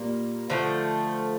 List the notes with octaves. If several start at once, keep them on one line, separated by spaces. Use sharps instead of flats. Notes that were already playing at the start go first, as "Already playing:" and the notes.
Already playing: A#2 G3 A#3
D3 F3 A3